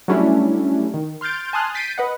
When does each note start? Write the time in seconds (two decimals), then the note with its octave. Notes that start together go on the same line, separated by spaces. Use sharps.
0.08 F#3 G3 A3 C#4 D4 E4
0.94 D#3
1.21 C6 F6 G6 A6 D7
1.53 G#5 A5 C6 D#6 F6 F#6
1.74 G6 A6 B6 C7 D7 D#7
1.98 B4 D#5 F#5